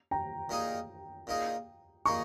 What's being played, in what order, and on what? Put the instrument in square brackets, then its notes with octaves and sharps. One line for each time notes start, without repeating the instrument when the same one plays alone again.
[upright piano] G5 A#5
[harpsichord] A#2 A#3 D#4 G#4
A#2 A#3 D#4 G#4
[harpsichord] A#2 A#3 D#4 G#4 [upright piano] A#5 C#6